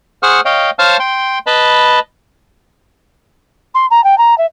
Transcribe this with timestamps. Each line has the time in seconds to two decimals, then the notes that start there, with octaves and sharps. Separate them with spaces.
0.23 G#4 C5 F#5 C#6 D#6 F6
0.45 C#5 D#5 F5 G5
0.79 C5 C#5 F5 A5 C#6 F6
1.00 G5 C6
1.47 B4 D#5 A5 B5
3.74 C6
3.90 A#5
4.04 G5
4.18 A#5
4.38 E5